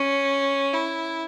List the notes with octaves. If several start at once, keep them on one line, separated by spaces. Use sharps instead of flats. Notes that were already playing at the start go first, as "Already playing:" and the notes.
Already playing: C#4
E4